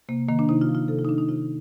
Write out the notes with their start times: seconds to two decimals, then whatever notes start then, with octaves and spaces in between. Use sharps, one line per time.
0.09 C3 A#3
0.28 D#3 A#3
0.39 D4
0.49 C3 D#4
0.61 F4
0.69 F3
0.75 F4
0.88 C3 A4
0.99 F4
1.04 D#4
1.08 D#3 D4
1.18 D#4
1.29 C3 F4